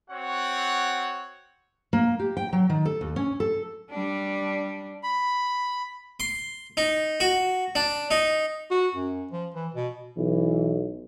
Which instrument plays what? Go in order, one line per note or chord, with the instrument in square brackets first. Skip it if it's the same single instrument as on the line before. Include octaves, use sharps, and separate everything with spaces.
[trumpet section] C4 F#4 C#5 F#5
[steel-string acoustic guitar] A#3
G4
G5
F#3
D#3
A4
D#2
C#4
A4
[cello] G3 D4
[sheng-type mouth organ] B5
[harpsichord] C6
D#4
F#4
D4
D#4
[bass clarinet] F#4
F#2
F3
E3
B2
[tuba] B1 [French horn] E3